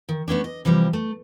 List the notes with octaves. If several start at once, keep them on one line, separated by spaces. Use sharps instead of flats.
D#3
A3 B3 C#4 D4
D#5
C3 E3 F3 G3
A3